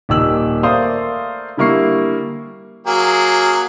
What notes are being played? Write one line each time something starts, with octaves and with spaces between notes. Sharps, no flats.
D#1 D#3 G4 E6 F#7
A3 A#4 C5 D5 F5 D#6
D3 G3 A#3 E4 C#6 C7
F#3 A#3 G#4